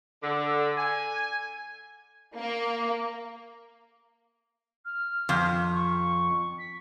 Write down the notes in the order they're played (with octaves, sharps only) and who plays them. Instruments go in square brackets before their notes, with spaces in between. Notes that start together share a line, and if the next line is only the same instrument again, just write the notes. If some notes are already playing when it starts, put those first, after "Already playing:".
[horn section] D3
G#5
[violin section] A#3
[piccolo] F6
[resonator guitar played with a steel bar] F2
[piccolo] C#6
B6